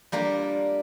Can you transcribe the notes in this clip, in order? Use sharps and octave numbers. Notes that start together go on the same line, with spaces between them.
G3 A#3 D4 F4